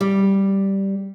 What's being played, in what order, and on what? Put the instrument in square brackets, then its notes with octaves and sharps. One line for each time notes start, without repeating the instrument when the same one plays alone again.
[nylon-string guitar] G3